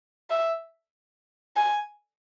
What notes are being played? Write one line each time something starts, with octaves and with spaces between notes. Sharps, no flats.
E5
G#5